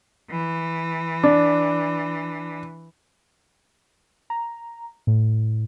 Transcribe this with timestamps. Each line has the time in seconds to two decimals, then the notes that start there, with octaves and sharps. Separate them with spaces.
0.31 E3
1.23 D4
4.30 A#5
5.07 A2